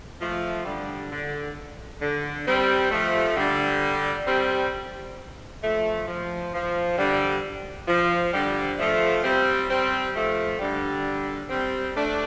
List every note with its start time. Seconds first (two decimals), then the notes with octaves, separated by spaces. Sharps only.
0.20 F3 A3
0.65 D3 G3
1.11 D3
2.01 D3
2.47 G3 C4
2.91 F3 A3
3.36 D3 G3
4.27 G3 C4
5.62 F3 A3
6.08 F3
6.53 F3
6.98 D3 G3
7.88 F3
8.33 D3 G3
8.78 F3 A3
9.24 G3 C4
9.69 G3 C4
10.15 F3 A3
10.59 D3 G3
11.49 G3 C4
11.95 A3 D4